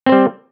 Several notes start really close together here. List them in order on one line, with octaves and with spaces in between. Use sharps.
C4 C5 G3